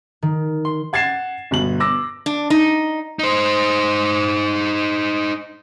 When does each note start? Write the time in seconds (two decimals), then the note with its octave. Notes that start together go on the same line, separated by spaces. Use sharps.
0.23 D#3
0.65 C6
0.93 F#5 G#6 A6 C7 E7
1.51 G1 B2 F#7
1.80 D6 E6 A#6
2.26 D4
2.50 D#4
3.19 D#4 C5